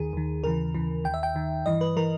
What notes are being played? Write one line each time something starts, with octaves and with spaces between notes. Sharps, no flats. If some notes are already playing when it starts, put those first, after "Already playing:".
Already playing: D#2 D#3 G#4
D#2 D#3
D#2 C#3 E3 A#4
D#2 C#3 E3
D#2 D#3 G5
E5
G5
D#2 D#3
G2 E3 D#5
B4
E3 A#4